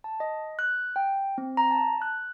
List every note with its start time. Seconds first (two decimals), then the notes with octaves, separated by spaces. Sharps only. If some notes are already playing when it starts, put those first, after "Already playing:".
0.04 A5
0.20 D#5
0.59 F#6
0.96 G5
1.38 C4
1.57 A#5
1.71 A5
2.02 F#6